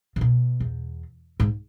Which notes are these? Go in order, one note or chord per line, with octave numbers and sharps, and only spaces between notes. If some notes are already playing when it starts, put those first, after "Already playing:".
C#3
B2
E2
G#2